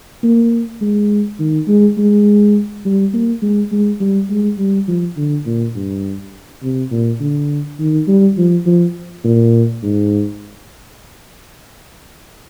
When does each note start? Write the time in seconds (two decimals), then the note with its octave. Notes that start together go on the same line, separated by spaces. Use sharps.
0.23 A#3
0.81 G#3
1.39 D#3
1.68 G#3
1.98 G#3
2.85 G3
3.13 A#3
3.42 G#3
3.71 G#3
4.00 G3
4.30 G#3
4.58 G3
4.88 F3
5.17 D3
5.46 A#2
5.75 G2
6.63 C3
6.91 A#2
7.20 D3
7.79 D#3
8.07 G3
8.38 F3
8.66 F3
9.24 A#2
9.82 G#2